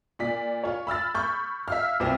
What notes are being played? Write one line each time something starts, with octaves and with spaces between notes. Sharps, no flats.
A#2 D5 B6
F4 C#5
B5 E6 F6 A6
B5 C#6 G6
E5 F5 F6
C2 C4 F6